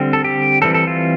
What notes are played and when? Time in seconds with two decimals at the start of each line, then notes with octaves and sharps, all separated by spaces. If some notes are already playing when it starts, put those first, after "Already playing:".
Already playing: D3 G3 C4
0.13 A4
0.24 G4
0.62 E3 G3 C4 A4
0.74 A4
0.87 F4